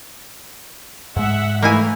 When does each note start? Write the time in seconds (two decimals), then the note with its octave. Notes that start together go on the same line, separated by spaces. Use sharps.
1.16 G#2 G#3 E5 F#5
1.62 E3 A3 A#3 E4 G#5